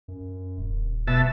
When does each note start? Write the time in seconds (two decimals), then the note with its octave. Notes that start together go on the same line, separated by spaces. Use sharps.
0.08 F#2
0.58 D#1
1.07 B2 E5 A5